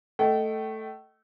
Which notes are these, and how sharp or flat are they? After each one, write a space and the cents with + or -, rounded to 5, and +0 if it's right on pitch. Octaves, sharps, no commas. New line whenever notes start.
A3 +0 D#5 +0 G5 -40